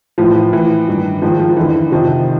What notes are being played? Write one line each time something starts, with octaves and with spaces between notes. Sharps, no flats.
A2 E3 F3
F3
A2 E3
G2 D#3
G#2 D#3 F3
F3
F2 D3 E3
F2 C3 D#3 F3